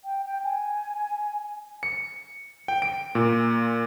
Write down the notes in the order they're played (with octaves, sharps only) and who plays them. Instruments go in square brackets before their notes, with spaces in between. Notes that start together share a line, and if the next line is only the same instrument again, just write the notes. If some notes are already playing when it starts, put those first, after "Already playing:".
[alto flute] G5
G5
G#5
[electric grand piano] C#7
G5
D7
A#2